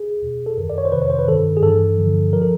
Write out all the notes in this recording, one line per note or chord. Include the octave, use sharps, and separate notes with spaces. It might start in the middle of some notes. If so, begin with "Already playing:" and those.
Already playing: G#4
E2 B2
A4
F#2 D#3 A#4
D5
C#5
C5
F2 C3 D#3 B4
C#5
C5
B4
G2 D#3 A4
G#4
G2 E3 A4
G2 D3 F3
F3 A#4
A4